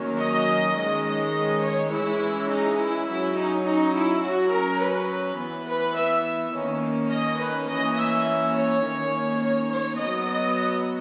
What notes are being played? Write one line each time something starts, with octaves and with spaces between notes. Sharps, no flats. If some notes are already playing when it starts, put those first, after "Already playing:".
Already playing: D#3 F#3 A#3 C#4
D#5
D#3 G#3 C#4 D#5
D#5
C#5
E3 G#3 C#4 E4
D#4
E4
F#3 C#4 E4
D#4
D#4
E4
F#3 C#4 F#4
A#4
B4
E3 B3
B4
E5
D#3 A#3 C#4
D#5
B4
E3 A#3 C#4 D#5
E5
C#5
D#3 A#3 C#4
C#5
C#5
F#3 B3 D#5
D#5